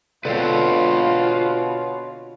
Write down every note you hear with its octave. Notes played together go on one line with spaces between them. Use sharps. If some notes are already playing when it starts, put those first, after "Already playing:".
B2 D3 C4 F4 B4 C#5 F5